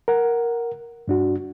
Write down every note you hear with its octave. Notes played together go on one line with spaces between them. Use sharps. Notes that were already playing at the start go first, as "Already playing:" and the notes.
A#4 F#5
G2 D4 F#4